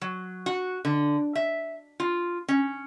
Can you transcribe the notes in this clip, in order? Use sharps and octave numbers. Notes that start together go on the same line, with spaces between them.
F#3
F#4
D3
E5
F4
C#4